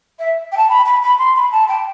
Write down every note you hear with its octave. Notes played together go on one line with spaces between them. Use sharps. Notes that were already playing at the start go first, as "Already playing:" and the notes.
E5
G5
A5
B5
B5
B5
C6
B5
A5
G5